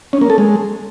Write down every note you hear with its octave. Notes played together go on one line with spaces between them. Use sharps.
C#4
A#3
A4
G#3